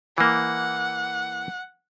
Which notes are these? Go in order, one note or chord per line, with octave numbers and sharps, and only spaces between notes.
E3 A#3 F#5